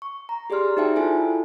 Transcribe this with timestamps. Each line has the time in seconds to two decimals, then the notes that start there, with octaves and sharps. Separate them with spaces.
0.02 C#6
0.29 A#5
0.50 G4 G#4 D5 C6 F6
0.77 D#4 F#4 C5 E5 G5 A5
0.96 E4 F4 A4 G#5